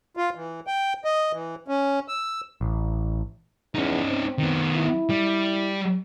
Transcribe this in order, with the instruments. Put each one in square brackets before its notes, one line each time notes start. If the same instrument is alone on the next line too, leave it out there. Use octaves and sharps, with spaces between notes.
[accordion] F4
E3
G5
D#5
E3
C#4
E6
[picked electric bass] A1
[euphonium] E2 [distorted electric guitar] C#4 D#4
[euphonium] C4
[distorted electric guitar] D#3 B3
[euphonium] E4
[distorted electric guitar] G3